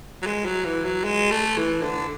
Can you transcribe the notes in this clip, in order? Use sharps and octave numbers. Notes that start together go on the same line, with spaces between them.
F#3
G#3
F#3
E3
F#3
G#3
A3
E3
D3